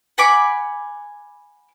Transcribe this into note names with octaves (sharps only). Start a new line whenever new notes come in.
F#5 G#5 B5 D6